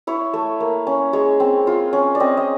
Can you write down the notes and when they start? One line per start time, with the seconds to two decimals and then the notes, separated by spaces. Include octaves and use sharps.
0.07 E4 C#5
0.33 A3
0.60 A#3
0.87 C#4
1.13 G#3 C#5
1.40 C4
1.67 F4
1.93 C#4
2.15 D5
2.20 C4 D#5
2.37 D#5